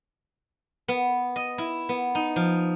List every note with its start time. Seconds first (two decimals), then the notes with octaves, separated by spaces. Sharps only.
0.88 B3
1.36 D#5
1.58 E4
1.89 B3
2.15 D#4
2.36 F3